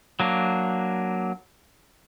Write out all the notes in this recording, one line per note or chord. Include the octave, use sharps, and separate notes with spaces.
F#3 A#3 D4